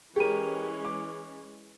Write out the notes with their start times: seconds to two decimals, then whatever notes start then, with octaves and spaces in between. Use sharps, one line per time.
0.16 E3 G#3 C#4 G4 G#4 A#4 D#7
0.85 D6